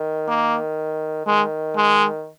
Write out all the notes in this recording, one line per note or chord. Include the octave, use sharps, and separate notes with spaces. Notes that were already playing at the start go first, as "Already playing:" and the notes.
Already playing: D#3
A#3
D#3 G#3
G#3